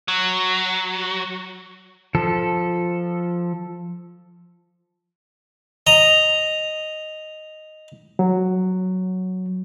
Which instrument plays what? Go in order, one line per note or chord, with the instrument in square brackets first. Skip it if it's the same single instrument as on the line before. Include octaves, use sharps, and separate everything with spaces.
[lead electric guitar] F#3
[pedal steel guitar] F3 A4
[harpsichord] D#5 A#5 D#6
[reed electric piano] F#3